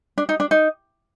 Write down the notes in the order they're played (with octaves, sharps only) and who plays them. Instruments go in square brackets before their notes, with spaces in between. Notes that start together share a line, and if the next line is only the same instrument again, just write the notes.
[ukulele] D4
D#4
D4
D#4